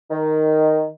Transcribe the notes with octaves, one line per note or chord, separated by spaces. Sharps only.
D#3